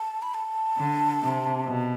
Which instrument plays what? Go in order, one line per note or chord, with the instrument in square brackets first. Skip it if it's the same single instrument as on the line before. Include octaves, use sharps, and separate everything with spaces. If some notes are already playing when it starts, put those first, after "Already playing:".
Already playing: [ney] A5
B5
A5
[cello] D3
C3
B2